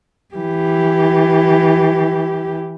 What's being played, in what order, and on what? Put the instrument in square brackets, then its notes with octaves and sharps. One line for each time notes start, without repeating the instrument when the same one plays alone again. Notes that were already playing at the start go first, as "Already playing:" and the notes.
[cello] E3 G4